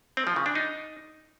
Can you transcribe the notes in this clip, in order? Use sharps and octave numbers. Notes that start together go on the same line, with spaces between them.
C4
F3
C#3
D4
D#4